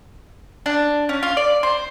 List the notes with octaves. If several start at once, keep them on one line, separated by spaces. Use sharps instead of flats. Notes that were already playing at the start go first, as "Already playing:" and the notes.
D4
C#4
F4
D5
C5